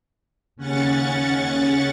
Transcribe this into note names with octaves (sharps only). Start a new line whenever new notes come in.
D#2 C#3 C#4 F#5 C#6 A6